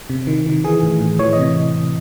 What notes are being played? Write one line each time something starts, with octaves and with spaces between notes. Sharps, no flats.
C3
D#3
D#3
E3 G#4
A2
A2
E3 C#5
D#5
C3